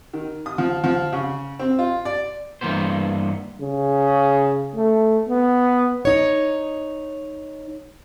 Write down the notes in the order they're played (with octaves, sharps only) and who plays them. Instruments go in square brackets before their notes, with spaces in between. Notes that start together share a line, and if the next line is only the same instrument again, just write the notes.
[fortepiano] D#3
D#6
F3
F3
C#3
C4
F4
D5
[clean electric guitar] G2 E3 A#3 B3 C5
[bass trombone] C#3
A3
B3
[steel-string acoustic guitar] D#4 C#5